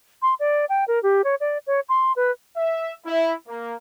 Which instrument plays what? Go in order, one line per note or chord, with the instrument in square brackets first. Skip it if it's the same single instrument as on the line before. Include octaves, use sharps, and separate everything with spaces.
[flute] C6
D5
G5
A#4
G4
C#5
D5
C#5
C6
B4
[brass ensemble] E5
E4
A#3